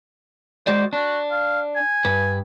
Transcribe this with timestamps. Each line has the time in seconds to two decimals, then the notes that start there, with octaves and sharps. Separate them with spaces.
0.67 G#3 F#4 C5 D5
0.93 D4 F#4
1.31 F5
1.76 G#5
2.05 G2 B4